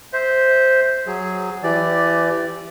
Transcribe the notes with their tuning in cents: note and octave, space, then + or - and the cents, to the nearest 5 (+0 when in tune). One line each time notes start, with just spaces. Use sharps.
C5 +0 E5 -15
F#3 +0 G#4 +0
E3 +25 G4 +0 D5 +0